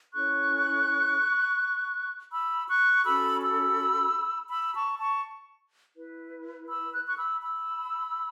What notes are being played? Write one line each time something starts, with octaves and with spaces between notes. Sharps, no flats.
C#4 E4 A4 C#5 C#6 F#6
B5 E6
C#6 F#6
C#4 F#4 A4 B5 E6
B5 E6
B5 E6
A5 C#6
A5 C#6
E4 B4
B5 E6
F#6
C#6 F#6
B5 E6
B5 E6